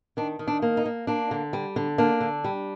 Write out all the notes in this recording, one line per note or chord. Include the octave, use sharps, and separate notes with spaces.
D#3 D4
D#3
D4
A#3
D#4
A#3
A#3 D4
D3
G3
D3
A#3 D4
D3
G3